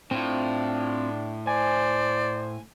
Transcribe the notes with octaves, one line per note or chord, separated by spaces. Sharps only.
A2 C4 D4 F4
C5 D5 G#5